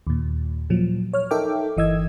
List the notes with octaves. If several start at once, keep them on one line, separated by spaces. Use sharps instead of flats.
D#2 A#2
A#2 F3 F#3
C#5 F6
D#4 A4 A#4 E5 G5 D6
G1 E3 D#5 E6 G#6